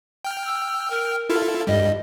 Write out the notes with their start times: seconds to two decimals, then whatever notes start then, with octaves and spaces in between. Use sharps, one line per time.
0.25 G5 F6
0.45 E6
0.90 A#4
1.30 E4 F4 A4
1.67 G2 G3 D#5